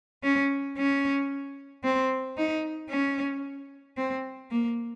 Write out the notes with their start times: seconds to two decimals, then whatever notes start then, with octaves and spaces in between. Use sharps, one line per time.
0.23 C#4
0.77 C#4
1.84 C4
2.37 D#4
2.90 C#4
3.97 C4
4.51 A#3